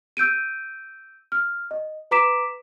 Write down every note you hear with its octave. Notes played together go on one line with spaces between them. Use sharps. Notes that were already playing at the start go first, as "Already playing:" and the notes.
E6 G6 D7 D#7
F6
D#5
B4 A#5 D6 B6 D7 E7